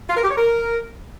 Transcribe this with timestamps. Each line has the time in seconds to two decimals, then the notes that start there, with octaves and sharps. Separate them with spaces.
0.09 F4
0.16 A#4
0.23 G4
0.30 C#5
0.37 A#4